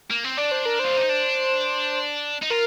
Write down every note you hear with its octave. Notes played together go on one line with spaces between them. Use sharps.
A#3
C4
D4 D5
C5
A#4
F4 C5
D#4
D4
D#4
F4 A#4